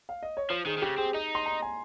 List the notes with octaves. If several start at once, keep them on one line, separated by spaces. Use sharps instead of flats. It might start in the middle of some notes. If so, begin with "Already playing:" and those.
F5
D#5
C#5
F3 C5
D#3 G#4
D#3
C#3 G4
C4 G#4
D#4 D#5
C6
A#5
G#5